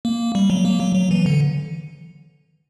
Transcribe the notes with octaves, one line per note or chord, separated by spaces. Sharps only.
A#3
G3
F#3
A#3
F#3
F#3
E3
D3